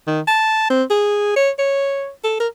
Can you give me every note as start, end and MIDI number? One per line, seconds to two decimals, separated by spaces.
0.07 0.20 51
0.28 0.70 81
0.70 0.83 60
0.90 1.32 68
1.36 1.51 73
1.59 2.09 73
2.24 2.38 69
2.40 2.48 70